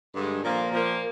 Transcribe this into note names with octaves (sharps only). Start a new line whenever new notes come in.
G2 D3 G#3
A#2 F3 A#3
A#2 F3 A#3